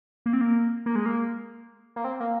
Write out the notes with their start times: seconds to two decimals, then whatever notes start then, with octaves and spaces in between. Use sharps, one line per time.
0.26 A#3
0.33 C4
0.41 A#3
0.86 A#3
0.96 G#3
1.06 A#3
1.96 A#3
2.04 C4
2.20 A#3